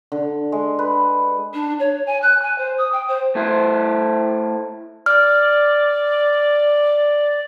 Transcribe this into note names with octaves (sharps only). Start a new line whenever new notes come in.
D3
G#3
B4
D4
C#5
G#5
F#6
G#5
C5
D#6
G5
C5
A3 E4 C5
D5 F6